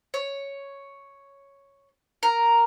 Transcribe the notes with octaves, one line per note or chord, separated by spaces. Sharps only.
C#5
A#4